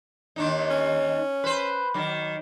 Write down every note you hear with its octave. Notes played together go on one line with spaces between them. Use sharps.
D#2 D4 D#4
C#4
B4 C5
D#3 F#3